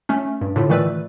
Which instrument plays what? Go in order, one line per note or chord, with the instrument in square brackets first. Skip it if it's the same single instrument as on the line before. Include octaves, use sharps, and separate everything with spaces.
[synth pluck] A3 C#4
G2
A2 D3 F4
D#3 E3 A3 B4 D5 E6